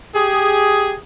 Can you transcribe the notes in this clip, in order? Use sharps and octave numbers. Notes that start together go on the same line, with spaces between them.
G4 G#4